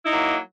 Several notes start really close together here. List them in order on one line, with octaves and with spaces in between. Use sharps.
E4 D#4 F#3 A#3